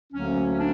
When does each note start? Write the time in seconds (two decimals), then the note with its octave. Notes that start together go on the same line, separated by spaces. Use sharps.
0.13 D2 D3 F#3 A#3 C#4
0.51 C#4
0.58 D4